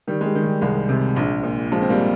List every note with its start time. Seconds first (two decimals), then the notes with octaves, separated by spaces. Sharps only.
0.07 D#3 G3
0.21 G#3
0.26 G3
0.35 D#3
0.44 G3
0.61 C2 G#3
0.89 C3
1.16 A#1
1.43 A#2
1.72 F3 G#3
1.82 C4
1.89 G3 A#3